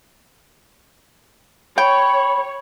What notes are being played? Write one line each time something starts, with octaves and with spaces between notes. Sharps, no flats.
C#5 G5 B5